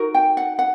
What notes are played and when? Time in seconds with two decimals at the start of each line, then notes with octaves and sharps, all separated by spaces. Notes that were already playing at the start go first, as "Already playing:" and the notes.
Already playing: D#4 F#4 A#4
0.14 G5
0.37 F#5
0.59 F#5